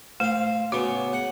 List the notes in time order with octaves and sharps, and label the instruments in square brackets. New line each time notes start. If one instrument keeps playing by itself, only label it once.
[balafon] A3 [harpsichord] C4 F5
[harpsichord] C#3 B3 C#4 [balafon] F#4
[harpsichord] F#5